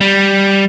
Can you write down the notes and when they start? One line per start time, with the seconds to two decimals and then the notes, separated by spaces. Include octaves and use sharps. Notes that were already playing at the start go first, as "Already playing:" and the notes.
0.01 G3